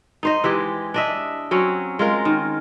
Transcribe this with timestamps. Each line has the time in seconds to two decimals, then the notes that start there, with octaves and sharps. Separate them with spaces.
0.23 D#4 C5 D#5
0.44 E3 G#3 G4
0.94 D4 D#5 E5
1.51 F#3 C4 C#4
1.99 G#3 F4 A#4
2.25 D#3